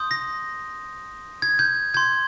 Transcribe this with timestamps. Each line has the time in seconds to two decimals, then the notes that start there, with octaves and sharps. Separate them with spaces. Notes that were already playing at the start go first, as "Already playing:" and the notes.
Already playing: C6 D#6 G6
0.11 A#6
1.42 G#6
1.59 G6
1.94 C6 G6 G#6